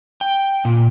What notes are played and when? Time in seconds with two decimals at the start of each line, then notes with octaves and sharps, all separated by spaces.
0.21 G5
0.65 A#2